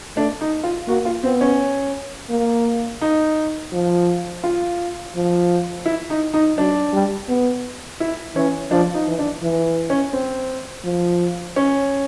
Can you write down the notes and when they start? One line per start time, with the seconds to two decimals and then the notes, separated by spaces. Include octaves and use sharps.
0.17 A3 D4
0.41 D#4
0.64 F4
0.88 A#3 F#4
1.05 F4
1.23 B3 C4
1.41 C#4
2.30 A#3
3.01 D#4
3.72 F3
4.44 F4
5.15 F3
5.86 E4
6.10 D#4
6.34 D#4
6.57 F#3 D4
6.93 G3
7.28 B3
8.00 E4
8.36 E3 C#4
8.71 F3 D4
8.94 D#4
9.07 E3
9.19 D4
9.42 E3
9.90 C#4
10.13 C4
10.84 F3
11.56 C#4